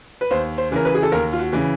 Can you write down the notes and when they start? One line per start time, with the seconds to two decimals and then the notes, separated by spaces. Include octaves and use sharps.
0.21 B4
0.31 D#2 C5
0.58 C5
0.71 C#3 E3 A#4
0.85 B4
0.94 G#4
1.03 A4
1.12 D#2 A#4
1.33 F4
1.39 F#4
1.53 C#3 E3